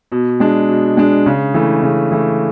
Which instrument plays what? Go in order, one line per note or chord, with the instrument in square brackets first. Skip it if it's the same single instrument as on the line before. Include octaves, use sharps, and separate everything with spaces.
[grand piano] B2
G#3 D4
B2
G#3 D4
C#3
E3 A3
C#3
E3 A3